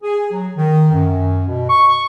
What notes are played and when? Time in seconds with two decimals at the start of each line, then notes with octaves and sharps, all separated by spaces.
0.02 G#4
0.32 F#3
0.57 D#3
0.93 F#2
1.47 B2
1.69 C#6